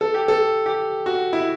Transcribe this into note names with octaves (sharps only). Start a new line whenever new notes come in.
A4
G4
A4
G4
F#4
E4